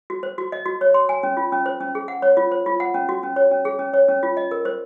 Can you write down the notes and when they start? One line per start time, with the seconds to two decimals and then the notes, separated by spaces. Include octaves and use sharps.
0.10 F#4
0.23 C5
0.38 F#4
0.52 D#5
0.66 F#4
0.81 C#5
0.94 C6
1.09 G#5
1.23 C#4
1.37 F4
1.52 C#4
1.66 C5
1.81 C#4
1.95 G#4
2.08 F#5
2.22 C#5
2.37 F4
2.52 C5
2.66 F4
2.80 F#5
2.94 C#4
3.09 F#4
3.23 C#4
3.36 C#5
3.51 C#4
3.65 G#4
3.79 C#4
3.94 C#5
4.09 C#4
4.23 F4
4.37 D#5
4.51 A#4
4.65 C5